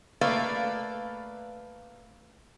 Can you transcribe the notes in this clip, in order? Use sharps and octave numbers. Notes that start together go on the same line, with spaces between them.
A3 A#3 B4 D5 F5